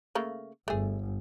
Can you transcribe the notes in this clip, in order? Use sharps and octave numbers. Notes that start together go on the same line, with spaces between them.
C#3 A3 A#3
G1 A3 G#4